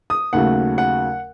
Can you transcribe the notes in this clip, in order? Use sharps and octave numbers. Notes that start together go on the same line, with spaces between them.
D#6
D#2 C#3 F#3 A3 F#5
F#5